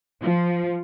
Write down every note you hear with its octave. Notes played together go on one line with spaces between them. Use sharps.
F3